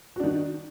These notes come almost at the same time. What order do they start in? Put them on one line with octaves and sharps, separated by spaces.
F#4 D4 D#3